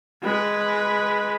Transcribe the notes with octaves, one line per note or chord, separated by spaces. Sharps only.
G#3 B4